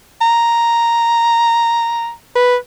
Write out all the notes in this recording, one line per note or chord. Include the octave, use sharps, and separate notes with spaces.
A#5
B4